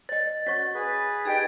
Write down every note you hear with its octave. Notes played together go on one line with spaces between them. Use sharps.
C#5 D#5 A6
C#4 F#4 C#5 C#6 B6
G#4 B4
D#4 G4 D#5 G5 G#6